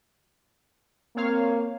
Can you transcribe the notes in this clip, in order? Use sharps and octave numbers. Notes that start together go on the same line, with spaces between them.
A#3 C4 C#5 F5